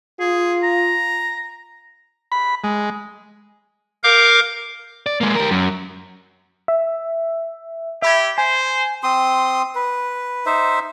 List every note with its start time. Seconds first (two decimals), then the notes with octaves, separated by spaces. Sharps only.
0.20 F4 G#4
0.64 A#5
2.32 B5
2.64 G#3
4.04 A#4 F5 D6 G6
5.06 D5
5.21 G#3 A#3
5.36 G4 A#4
5.51 F#2
6.68 E5
8.02 G4 E5 B5 G#6
8.38 C5 G#5
9.03 C4 C6 D#6
9.75 B4
10.46 D#4 C5 E5